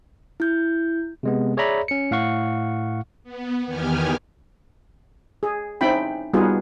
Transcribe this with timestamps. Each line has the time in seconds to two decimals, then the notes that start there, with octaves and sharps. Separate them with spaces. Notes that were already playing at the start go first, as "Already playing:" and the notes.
0.40 E4 G6
1.23 C3 G#3 B3
1.57 G#4 C#5 D5 E5 A#5 B5
1.88 C#4 C#7
2.11 A2 F5 F#5 C#6
3.24 B3
3.66 E2 D#3 B3 G4 G#5 F6
5.43 G#4
5.81 C4 C#4 D#4 E4 G5 B5
6.34 G3 B3 D#4 F4 F#4 G#4